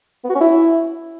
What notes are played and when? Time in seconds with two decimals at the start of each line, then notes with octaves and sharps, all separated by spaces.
0.24 B3
0.30 F#4
0.35 C#4
0.41 E4